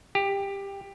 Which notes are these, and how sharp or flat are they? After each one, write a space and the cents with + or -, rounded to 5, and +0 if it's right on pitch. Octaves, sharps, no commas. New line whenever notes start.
G4 +15